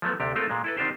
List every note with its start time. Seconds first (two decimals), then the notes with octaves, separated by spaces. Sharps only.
0.02 F3 F#3 A3 B3
0.20 D2 C3 D4 G4
0.35 G#3 A3 C4 F4 A4 A#4
0.49 A#2 G#3
0.64 E4 A4 B4
0.77 D#3 C4 D4 F4 G4 C5